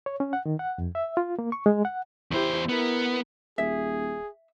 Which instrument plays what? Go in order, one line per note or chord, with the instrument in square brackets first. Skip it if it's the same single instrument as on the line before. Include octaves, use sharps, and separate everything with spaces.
[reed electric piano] C#5
C#4
F#5
D#3
F#5
F2
E5
F4
A#3
C#6
G#3
F#5
[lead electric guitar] E2 C5 [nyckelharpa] E4 G4
[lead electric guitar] B3 [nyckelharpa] E4 A#4
[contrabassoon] D#1 [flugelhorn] G#4 [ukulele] E5